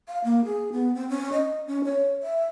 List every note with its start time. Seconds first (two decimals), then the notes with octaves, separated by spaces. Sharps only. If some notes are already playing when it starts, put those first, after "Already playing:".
0.08 F5
0.24 A#3
0.45 G#4
0.72 B3
0.95 C4
1.09 C#4
1.33 D#5
1.67 C#4
1.85 C#5
2.23 E5